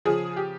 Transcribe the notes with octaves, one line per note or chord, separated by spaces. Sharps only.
C#3 F3 G#4
G4